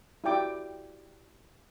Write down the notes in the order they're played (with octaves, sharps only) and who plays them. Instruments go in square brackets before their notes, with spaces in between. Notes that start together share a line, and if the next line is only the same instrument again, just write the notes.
[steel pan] E4 F#4 G4 D5 G5 D6